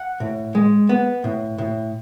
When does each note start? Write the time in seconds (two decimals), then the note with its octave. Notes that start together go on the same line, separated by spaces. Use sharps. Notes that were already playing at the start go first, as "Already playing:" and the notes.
Already playing: F#5
0.20 A2
0.55 G#3
0.89 B3
1.24 A2
1.58 A2